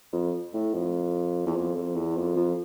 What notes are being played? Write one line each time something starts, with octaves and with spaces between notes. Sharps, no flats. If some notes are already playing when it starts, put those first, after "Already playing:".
F2
A2
F2
E2
F2
F2
E2
F2
F2